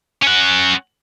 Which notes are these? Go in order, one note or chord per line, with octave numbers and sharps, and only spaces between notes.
C#4 F#5